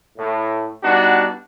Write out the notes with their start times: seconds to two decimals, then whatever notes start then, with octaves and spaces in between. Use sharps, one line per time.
0.17 A2
0.83 G3 B3 D4 D#4 F#4